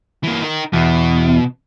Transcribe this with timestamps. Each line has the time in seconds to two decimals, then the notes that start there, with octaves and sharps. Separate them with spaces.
0.24 E3 A#3
0.43 D#4 A#4
0.73 E2 B2